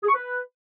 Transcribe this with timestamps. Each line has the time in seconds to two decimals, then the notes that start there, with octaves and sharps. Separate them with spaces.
0.04 G#4
0.09 C#6
0.14 B4